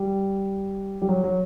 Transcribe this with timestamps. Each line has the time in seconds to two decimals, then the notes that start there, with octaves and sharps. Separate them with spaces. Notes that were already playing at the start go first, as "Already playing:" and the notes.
Already playing: G3
1.02 G3
1.09 F#3
1.24 F#3